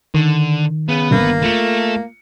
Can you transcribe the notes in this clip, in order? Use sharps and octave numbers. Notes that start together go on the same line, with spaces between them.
D3 D#3
C#3 B3
G1 A#3
A3 F4 C#7